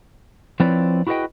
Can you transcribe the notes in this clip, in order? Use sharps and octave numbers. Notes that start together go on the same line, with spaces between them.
F3 C4 E4 B4 C#5 D5
E4 F#4 G#4 B4 D#5 G5